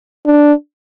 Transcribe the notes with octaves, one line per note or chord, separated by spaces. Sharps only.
D4